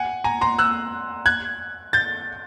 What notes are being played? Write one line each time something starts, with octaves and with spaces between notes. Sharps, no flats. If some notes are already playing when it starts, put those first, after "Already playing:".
Already playing: F#5 G#5
G#5 A#5
A#5 C6
E6 F#6
F#6 G#6
G6 A6